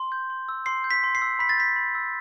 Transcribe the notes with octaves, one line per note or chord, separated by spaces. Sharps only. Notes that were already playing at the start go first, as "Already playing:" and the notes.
Already playing: C6
G6
C6
E6
C6 C7
G6
B6
C6
C7
E6
B5 B6
A6
G6 B6
B5
E6